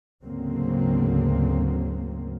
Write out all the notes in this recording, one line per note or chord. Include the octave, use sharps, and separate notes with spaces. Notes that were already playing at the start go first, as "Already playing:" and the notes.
D2 G#2 C#3 F#3 A#3 C4